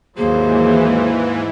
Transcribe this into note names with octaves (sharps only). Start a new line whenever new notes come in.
D#2 G#2 E3 F#3 A#3 G#4 C5